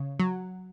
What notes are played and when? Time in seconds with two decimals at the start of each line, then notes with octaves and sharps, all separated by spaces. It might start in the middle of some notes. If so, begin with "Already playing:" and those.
Already playing: C#3
0.20 F#3